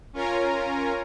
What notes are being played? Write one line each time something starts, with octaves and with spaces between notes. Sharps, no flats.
C#4 F4 A#4 C#5 G#5 A#5